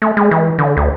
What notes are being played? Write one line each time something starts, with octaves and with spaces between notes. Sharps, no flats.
A3
G#3
E3
D3
D2